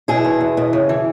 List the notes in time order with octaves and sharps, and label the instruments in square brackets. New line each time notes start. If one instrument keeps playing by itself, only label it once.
[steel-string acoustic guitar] B2 E4 G#4
E2
E2
B2
C#3
E3